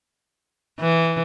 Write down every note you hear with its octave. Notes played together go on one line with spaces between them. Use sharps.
E3